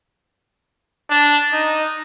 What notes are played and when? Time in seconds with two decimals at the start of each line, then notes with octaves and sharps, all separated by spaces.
1.10 D4
1.53 D#4